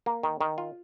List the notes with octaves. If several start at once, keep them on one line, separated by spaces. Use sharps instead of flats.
A#3
D#3
D#3
F4